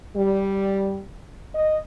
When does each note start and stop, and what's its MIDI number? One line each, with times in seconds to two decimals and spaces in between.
0.16 1.02 55
1.55 1.80 75